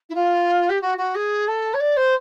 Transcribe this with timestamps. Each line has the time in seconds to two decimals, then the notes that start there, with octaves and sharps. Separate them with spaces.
0.09 E4
0.15 F4
0.69 G4
0.81 F#4
0.97 F#4
1.15 G#4
1.47 A4
1.74 C#5
1.80 D5
1.96 C5